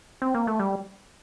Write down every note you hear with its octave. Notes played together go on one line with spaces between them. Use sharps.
C4
A#3
A3
G3